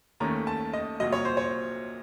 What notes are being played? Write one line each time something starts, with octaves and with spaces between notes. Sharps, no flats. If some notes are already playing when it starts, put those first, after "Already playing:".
D#2 D#3 A3 C#4 A#5
A5
D#5
C2 A#2 F#3 D#5
C#5
C5
C#5